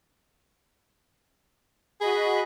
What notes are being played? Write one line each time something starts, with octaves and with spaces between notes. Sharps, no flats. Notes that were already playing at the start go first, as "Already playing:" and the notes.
F#4 G#4 D#5 B5